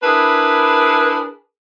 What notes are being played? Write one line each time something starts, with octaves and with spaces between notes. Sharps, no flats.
D4 E4 G#4 A#4 B4